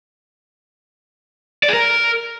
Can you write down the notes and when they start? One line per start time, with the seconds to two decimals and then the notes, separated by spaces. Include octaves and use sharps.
1.63 D5
1.68 G#4
1.73 A#4